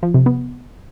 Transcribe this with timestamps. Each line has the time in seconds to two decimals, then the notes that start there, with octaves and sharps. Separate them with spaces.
0.03 F3
0.14 C3
0.26 B3